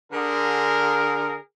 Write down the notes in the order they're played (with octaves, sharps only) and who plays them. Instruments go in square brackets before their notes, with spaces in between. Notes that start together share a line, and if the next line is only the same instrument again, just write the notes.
[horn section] D3 G#4 A#4